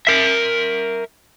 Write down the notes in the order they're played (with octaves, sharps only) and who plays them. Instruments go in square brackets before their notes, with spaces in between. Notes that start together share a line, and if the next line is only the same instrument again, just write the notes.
[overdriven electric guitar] A#4 E5